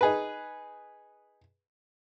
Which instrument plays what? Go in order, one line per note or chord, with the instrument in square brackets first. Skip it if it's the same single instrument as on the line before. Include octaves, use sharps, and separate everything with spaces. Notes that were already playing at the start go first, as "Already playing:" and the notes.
[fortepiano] D#4 G#4 B4